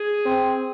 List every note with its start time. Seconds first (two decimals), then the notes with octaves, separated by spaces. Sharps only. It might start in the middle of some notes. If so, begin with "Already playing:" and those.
Already playing: G#4
0.26 C4